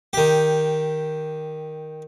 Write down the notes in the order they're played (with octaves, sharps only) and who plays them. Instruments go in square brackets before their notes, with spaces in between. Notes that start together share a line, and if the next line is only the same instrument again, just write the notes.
[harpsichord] D#3 G4